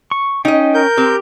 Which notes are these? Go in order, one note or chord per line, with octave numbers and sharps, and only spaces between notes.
C#6
C#4 D#4 D#5 G5
A#4 G6
C4 G4